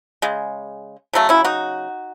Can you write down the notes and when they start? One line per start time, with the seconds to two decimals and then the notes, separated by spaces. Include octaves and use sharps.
0.22 C#3 G#3
1.13 C#3 F#3 A3
1.29 C#4 E4
1.45 D#4 F#4